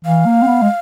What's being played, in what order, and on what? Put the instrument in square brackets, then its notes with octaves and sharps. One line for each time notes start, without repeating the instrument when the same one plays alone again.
[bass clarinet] E3 [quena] F5
[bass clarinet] A#3
C4
B3
G#3